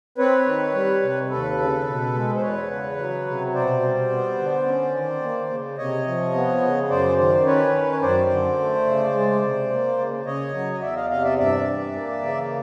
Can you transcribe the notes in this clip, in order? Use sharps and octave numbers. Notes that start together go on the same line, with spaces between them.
C4 B4 C#5
D#3
G3
C3
D#2 A4 B4
C#3
B2
G#3
C5
E2 B4 C#5
C#3
F#3
C3
B2 C5 D5
G3
B3
D3
C#4
D#3
A#3
C#3
C3 C#5 D#5
F3
B3
C#3
F#2 C5 D5
D#3 C5 D5
C#4 B4 C#5
D#3
C#5
F#2 C5 D5
D3
A3
C#3
G#3
C3
A#3
C#3
C#3 C#5 D#5
F#3
D#5
E2 D5 E5
D#5 F5
C3 D#5 F5
D5 E5
G2 D5 E5
E3
A#3
C#3